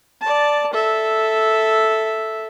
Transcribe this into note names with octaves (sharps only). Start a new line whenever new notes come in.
D5 A5
A4 E5